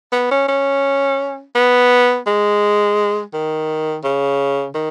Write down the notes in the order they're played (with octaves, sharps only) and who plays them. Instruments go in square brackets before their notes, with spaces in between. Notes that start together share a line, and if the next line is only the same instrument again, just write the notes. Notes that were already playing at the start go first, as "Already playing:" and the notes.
[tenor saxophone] B3
C#4
C#4
B3
G#3
D#3
C#3
D#3